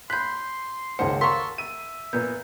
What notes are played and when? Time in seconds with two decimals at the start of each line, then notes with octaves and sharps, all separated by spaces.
0.10 B5 C6 F#6 G6 B6
0.99 C#2 D#3 G#3 C5 F#5 A5
1.21 A4 A#4 F5 A#5 C6 C#6 B6
1.58 E5 D#7
2.13 A#2 B3 G6